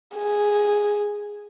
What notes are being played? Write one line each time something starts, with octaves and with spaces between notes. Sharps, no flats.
G#4